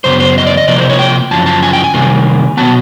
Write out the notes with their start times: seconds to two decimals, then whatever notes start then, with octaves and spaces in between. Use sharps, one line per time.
0.04 F#2 C#3 B3 C5
0.20 C5
0.38 D#5
0.46 D5
0.57 D#5
0.68 C3 F3 A#3 D5
0.78 C5
0.89 C#5
0.99 G5
1.31 F#2 C#3 F3 A5
1.46 A5
1.63 G#5
1.73 G5
1.84 G#5
1.94 C3 D#3 G3 A#3
2.57 B2 F#3 B3 A5